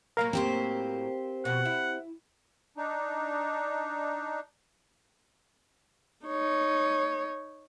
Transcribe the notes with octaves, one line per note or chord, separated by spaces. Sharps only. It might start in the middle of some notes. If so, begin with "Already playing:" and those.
A2 F#3 A#3 A#4 F5
C4 G4 C5
F2 B2 F#5
E4
D4 D#4
D#4 C#5